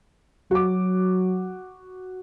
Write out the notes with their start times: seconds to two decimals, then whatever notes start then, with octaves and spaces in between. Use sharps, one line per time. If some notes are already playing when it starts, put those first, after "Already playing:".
0.51 F#3 F#4 D6